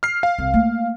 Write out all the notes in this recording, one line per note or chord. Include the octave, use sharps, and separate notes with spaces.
F6 C7
F5
C2
A3 A#3